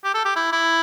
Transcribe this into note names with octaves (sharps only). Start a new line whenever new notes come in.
G4
A4
G4
E4
E4